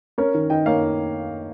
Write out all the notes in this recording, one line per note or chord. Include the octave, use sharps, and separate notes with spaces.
C#4 A#4 C#5
D#3
D#3 D#5 G5
A#3 C#5 F5